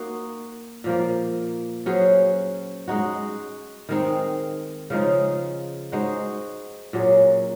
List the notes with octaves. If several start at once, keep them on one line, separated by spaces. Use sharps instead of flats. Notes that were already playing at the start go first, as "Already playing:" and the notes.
Already playing: A#3 D#4 F#4
A#2 F3 A#3
F#3 C#4 G#4 C5
G#3 D#4 F#4
D#3 G#3 C4 D#4
C#3 F3 G#3 D#4
G#3 D#4 F#4 C5
A#2 F#3 C#4 G#4